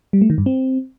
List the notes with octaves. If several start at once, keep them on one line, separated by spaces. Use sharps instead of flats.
G3
A3
D#3
G2
C4